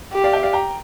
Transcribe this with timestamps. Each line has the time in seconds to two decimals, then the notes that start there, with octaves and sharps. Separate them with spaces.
0.13 G4
0.24 D5 F5
0.33 E5 G5
0.43 D5 F5
0.53 G5 A#5